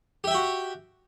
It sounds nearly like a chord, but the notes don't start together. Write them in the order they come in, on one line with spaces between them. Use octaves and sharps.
G4 E5 G5 F#4